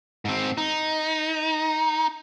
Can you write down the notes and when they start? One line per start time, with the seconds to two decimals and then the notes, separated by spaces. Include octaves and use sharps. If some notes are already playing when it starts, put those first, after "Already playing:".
0.25 G#2 C4
0.57 D#4